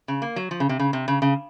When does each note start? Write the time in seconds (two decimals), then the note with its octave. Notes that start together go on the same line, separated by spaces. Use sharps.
0.08 C#3
0.22 A#3
0.36 F#3
0.51 F3
0.60 C#3
0.69 C3
0.79 C#3
0.93 C3
1.08 C#3
1.22 C#3